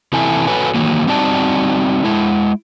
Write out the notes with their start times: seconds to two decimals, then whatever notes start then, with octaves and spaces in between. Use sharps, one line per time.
0.13 C3 E3 E4 A4 G#5
0.47 F#4 A4 B4 C#5 G#5
0.75 D#3 E3 F#3 A#3
1.07 G3 C4 D#4 F#4 D5 A5
2.05 G#3 E4